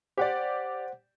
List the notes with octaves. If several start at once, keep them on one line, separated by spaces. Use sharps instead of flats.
G4 C5 D5 F#5